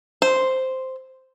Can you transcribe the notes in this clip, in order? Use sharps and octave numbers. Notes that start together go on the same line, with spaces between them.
C5